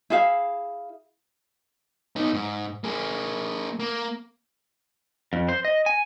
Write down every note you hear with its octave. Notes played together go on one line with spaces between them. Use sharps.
E4 G#4 E5 F5
B3 D#4
G#2
A#3 G#4
A#3
F2
C5
D#5
G#5